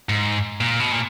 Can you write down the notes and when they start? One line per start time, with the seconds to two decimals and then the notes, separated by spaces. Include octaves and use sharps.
0.09 G#2
0.61 A#2
0.80 B2
0.92 A#2